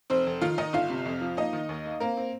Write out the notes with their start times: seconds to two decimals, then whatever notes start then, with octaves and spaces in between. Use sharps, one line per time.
0.10 F1 C4 C5
0.27 F1
0.41 D#3 F4 F5
0.58 D#3 D#4 D#5
0.73 G1 F4 F5
0.90 C3
1.06 F2
1.21 F3
1.37 A#3 D#4 D#5
1.53 D#3
1.69 D#2
1.85 A#3
2.00 A#3 C4 A#4
2.17 C4